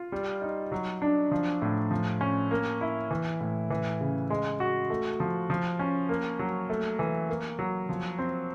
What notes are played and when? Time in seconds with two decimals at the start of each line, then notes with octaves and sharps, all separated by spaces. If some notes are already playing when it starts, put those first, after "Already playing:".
Already playing: F4
0.12 G3
0.42 D#4
0.72 F#3
1.02 D4
1.32 F3
1.62 A2
1.91 F3
2.21 C#4
2.51 A#3
2.81 E4
3.11 E3
3.41 A2
3.71 E3
4.01 C#3
4.30 G#3
4.60 F#4
4.90 A3
5.20 F3
5.50 F3
5.79 C#4
6.09 A#3
6.39 F#3
6.70 A3
6.99 E3
7.29 A#3
7.59 F#3
7.89 F3
8.19 C4